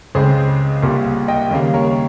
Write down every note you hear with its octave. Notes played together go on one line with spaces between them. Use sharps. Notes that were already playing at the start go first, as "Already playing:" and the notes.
C#2 C#3 G#3 C4 G#4 C5
C2 A#2 G3
D#5 G5
D#2 C#3 G3 A#3
A#4 C#5